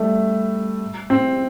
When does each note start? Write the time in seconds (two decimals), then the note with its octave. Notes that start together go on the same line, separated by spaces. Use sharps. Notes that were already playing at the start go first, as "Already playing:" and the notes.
Already playing: G3 A3
1.10 C4